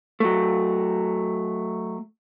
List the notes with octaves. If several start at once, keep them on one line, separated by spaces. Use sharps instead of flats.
F#3 A3